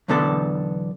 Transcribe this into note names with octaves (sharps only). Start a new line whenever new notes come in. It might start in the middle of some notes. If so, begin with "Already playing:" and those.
B1 E2 D3 B3 A4 D5